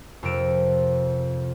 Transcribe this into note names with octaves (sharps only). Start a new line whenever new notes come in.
F2 C3 A#4 D7 E7